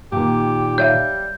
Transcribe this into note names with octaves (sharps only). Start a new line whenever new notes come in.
A#2 D#3 G4
G3 C#5 E5 F5 G6